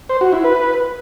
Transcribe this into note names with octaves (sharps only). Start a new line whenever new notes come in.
C5
F#4
E4
B4